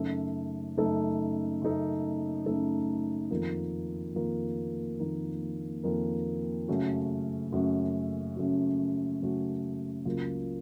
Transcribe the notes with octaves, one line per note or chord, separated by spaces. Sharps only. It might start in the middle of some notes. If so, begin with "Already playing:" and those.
Already playing: F#2 C#3 A3 D#4 A4
F#2 C#3 A3 D#4 A4
F#2 C#3 A3 D#4 A4
F#2 C#3 A3 D#4 A4
F2 D#3 A#3 F4 A#4
F2 D#3 A#3 F4 A#4
F2 D#3 A#3 F4 A#4
F2 D#3 A#3 F4 A#4
F#2 C#3 A3 C#4 F#4
F#2 C#3 A3 C#4 F#4
F#2 C#3 A3 C#4 F#4
F#2 C#3 A3 C#4 F#4
C#2 C#3 F#3 A#3 F4